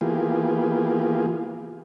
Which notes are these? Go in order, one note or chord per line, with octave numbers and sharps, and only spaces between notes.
E3 A#3 B3 F4 G4 G#4